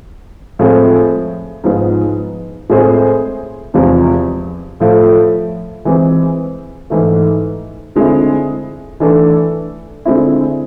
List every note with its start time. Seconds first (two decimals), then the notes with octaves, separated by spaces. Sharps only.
0.59 A2 F3 G#3 C4
1.64 G#2 F3 G#3 B3
2.70 A2 G#3 C4 G#4 C5
3.74 E2 C3 F3 G#3
4.80 A2 F3 A3
5.85 E3 G#3 C4
6.90 G#2 E3 A3
7.96 D3 G#3 C4 E4
9.00 E3 A3 D4 A4
10.05 D3 G#3 C4 E4